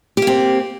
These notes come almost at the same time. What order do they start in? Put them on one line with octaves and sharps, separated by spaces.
G4 A#3 C4